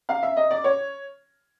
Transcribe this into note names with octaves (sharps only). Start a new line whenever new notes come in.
F5
E5
D#5
D5
C#5